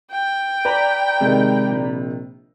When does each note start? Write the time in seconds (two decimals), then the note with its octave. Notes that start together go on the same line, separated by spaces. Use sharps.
0.12 G5
0.65 B4 D5 A#5 B5
1.21 C3 D#3 G#3
1.69 A#1